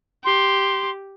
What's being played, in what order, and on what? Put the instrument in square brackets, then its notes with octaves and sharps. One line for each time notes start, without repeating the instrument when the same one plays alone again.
[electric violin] G4 [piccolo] C6